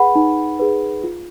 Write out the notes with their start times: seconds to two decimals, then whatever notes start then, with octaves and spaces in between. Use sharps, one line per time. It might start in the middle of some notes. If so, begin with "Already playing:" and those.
Already playing: G#4 B4 F#5 B5
0.15 D#4
0.60 G#4 B4
1.04 F4